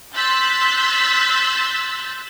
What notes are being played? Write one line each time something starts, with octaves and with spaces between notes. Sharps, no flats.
C6 E6 F#6 G6 A6 B6